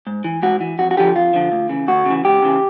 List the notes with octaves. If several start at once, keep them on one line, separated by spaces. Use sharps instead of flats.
G#2
E3
G#2 F#4
E3
F2 F#4
F#4
D3 F3 G4
F2 F4
D3 F3
D2
C#3 E3
D2 F#4
C#3 E3
C#2 G4
C#3 E3